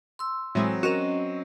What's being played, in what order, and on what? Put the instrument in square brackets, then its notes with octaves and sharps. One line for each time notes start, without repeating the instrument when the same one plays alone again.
[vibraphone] C6 E6
[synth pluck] A2 E3 G#3 [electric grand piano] F#3 C4
[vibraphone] C#4 D#5 [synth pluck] F#4 A#4